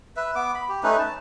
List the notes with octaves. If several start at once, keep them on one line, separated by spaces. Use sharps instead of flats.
B4 E5
B3 D6
B5
G4
A3 C#4 D#4 B4
A5